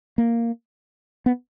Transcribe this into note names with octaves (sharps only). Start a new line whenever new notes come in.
A#3
B3